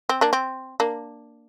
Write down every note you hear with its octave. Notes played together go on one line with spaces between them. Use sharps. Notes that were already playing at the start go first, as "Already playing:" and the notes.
C4
A#3 D4
C4
A#3 D4